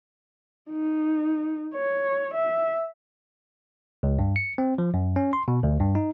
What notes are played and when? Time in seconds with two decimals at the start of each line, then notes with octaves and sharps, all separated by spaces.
0.71 D#4
1.74 C#5
2.34 E5
4.03 C#2
4.19 G2
4.36 C#7
4.58 C4
4.78 F3
4.94 F#2
5.16 C#4
5.33 C6
5.48 B2
5.63 D2
5.80 G2
5.95 D#4